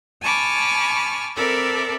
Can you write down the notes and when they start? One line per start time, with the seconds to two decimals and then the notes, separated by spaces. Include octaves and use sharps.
0.22 G#5 A5 B5 C#6 D6 F6
1.36 C4 A4 A#4 D5 E5 B5